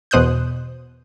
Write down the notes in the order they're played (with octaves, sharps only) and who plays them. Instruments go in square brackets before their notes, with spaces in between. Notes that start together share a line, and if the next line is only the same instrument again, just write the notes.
[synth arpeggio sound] E2 B2 C5 D#6 F#6 G6